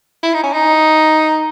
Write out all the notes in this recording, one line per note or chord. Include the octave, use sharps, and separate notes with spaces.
E4
D#4
C#4
D#4